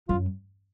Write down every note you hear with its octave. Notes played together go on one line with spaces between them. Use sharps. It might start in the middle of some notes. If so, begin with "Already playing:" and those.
F#2 F4